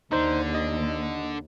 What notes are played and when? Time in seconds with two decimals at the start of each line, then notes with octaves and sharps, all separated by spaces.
0.12 D#2 D3 D#4 C5
0.54 D#5